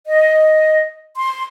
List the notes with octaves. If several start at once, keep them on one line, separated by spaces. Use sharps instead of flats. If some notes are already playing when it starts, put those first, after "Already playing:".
D#5
C6